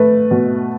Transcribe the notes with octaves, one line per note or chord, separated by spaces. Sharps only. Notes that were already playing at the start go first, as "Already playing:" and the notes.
Already playing: A3 B4
B2